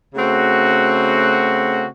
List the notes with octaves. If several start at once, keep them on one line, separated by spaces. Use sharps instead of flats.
C#3 A3 C4 F#4